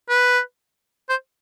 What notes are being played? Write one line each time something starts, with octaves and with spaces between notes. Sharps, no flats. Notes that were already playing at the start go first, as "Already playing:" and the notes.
B4
C5